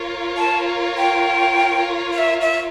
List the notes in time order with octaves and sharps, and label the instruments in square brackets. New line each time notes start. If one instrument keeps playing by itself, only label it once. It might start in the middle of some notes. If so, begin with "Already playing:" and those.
Already playing: [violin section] F4 A#4 C#5
[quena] A5
G5
F5
E5
E5